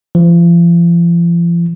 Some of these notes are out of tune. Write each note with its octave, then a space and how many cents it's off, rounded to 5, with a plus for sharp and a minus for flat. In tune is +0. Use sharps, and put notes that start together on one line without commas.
F3 -40